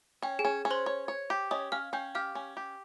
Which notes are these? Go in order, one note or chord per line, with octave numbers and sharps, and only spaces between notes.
C#4 G5
G#4 G#5
C#4
C#4
C5 C6
C#5
C#5
G4
C#4 D#5 D#6
C#4 F5 F6
C#4 G5 G6
G4 F5 F6
C#4
G4